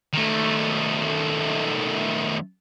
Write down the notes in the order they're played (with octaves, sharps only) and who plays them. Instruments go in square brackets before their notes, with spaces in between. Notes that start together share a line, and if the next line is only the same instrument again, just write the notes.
[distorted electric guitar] D#3 A3